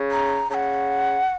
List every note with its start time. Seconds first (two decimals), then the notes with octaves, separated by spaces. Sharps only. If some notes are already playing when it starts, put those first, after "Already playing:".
Already playing: C#3
0.11 A#5
0.50 C#3 F#5 A#5